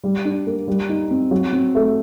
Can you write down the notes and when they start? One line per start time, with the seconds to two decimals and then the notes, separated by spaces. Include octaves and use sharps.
0.04 G3
0.25 D4
0.47 A#3
0.68 G3
0.89 D#4
1.11 C4
1.31 F#3
1.53 C4
1.75 A3